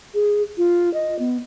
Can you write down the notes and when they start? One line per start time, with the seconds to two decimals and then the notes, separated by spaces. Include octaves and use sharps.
0.14 G#4
0.57 F4
0.94 D#5
1.19 B3